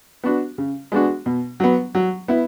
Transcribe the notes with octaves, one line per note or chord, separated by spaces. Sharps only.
B3 D4 F#4
C#3
G#3 B3 D4 F#4
B2
F#3 B3
F#3
B3 E4